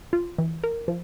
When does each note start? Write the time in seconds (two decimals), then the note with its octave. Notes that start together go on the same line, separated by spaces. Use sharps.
0.13 F4
0.38 E3
0.64 A#4
0.88 F3